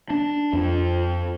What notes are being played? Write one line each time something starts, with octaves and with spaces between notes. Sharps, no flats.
D4
F2